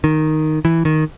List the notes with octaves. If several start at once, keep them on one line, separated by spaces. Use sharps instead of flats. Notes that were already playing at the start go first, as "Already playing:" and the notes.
D#3
E3
D#3